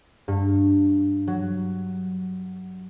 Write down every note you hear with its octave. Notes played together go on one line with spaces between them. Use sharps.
G2
F#3